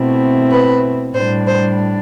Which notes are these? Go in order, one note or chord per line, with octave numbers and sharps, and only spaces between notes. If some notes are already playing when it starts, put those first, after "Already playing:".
Already playing: B2 A3 C4 E4
B4
A2 G3 D4 C5
C5